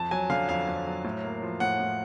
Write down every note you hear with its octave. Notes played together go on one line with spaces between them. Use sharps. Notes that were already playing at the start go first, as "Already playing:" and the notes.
Already playing: F2 A5
F#3 G#5
D3 F5
F2 F5
F2
F#3
A2
A#3
F3
A2 F#5
A2